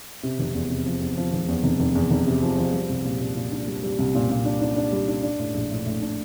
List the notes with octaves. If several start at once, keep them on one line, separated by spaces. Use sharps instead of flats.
C3
F1
E2
C3
F3
E2
F3
F1
E2
F1
F1
E2
F1
C3
F3
F3
G3
C2
A#2
A#2
A#2
D4
G3
G3
C2
A#2
A#2
D4
D4
D4
G3
D4
D4
A2
A#1
A2
A2
D4